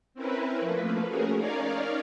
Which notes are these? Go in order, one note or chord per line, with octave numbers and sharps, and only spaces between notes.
C4 C#4 E4 A#4 B4
F3 A3 A#3 B4
A3 C#4 F#4 G#4 A#4
C#4 D#4 A#4 C#5 D5 F5